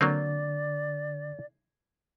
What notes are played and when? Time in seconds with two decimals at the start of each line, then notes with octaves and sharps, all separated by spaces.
0.01 D3 F#3 A#3 C4 D5